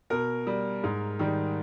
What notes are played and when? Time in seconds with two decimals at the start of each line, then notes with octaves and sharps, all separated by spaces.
0.10 B2 A#4
0.47 G3
0.84 G#2
1.19 D#3 G3